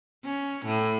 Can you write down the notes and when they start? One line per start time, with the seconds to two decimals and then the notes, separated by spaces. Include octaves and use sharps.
0.25 C#4
0.65 A2